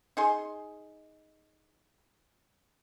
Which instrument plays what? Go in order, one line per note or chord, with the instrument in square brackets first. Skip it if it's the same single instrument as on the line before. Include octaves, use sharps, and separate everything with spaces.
[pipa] D#4 G#4 C6